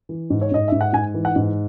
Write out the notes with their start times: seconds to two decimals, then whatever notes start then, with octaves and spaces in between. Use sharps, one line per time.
0.09 E3
0.30 G#2
0.41 C#5
0.52 G#2 D#5
0.68 G#2 E5
0.81 F#5
0.93 G#2 G#5
1.14 E3
1.25 F#5
1.36 G#2